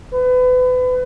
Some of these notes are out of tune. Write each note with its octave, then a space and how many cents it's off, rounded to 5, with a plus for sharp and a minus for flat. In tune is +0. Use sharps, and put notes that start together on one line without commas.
B4 +30